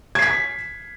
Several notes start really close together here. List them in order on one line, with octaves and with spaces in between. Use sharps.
G#6 C7 B6